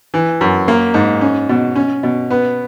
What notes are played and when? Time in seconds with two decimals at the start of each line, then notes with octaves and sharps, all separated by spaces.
0.14 E3
0.41 F#2
0.68 A#3
0.94 G#2
1.21 C#4
1.49 B2
1.76 C#4
2.03 B2
2.30 B3